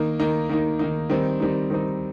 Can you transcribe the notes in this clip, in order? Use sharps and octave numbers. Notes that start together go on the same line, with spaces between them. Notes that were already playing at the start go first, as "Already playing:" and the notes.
Already playing: D#3 A#3 D#4
D#3 A#3 D#4
D#3 A#3 D#4
D#3 A#3 D#4
D#3 G3 C4 D#4
D#3 G3 C4 D#4
D#3 G3 C4 D#4